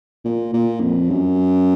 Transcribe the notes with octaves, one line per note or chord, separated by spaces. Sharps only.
A#2
A#2
F2
F#2